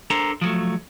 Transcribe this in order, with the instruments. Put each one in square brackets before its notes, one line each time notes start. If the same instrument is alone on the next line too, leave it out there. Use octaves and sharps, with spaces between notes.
[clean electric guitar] D4 A4 A#4 C5 A#5
F3 F#3 A3